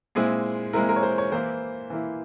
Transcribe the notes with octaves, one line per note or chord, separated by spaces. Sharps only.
A#2 G#3 C4 E4 G#4
A#2 G#3 C4 E4 A#4
A#4
C#5
C5
C#5
E3 A#3 E4 C5
E3 A#3 E4